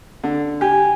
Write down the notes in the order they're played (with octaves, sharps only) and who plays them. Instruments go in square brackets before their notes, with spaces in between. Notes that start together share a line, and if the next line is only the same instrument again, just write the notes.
[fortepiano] D3
[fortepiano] G4 [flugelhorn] G#5